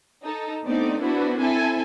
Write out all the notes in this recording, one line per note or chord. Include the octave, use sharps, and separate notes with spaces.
D#4 A4
A3 B3 C4 D4 D#4 D5
B3 D4 E4 F#4 B4 C5
C4 E4 A4 E5 G#5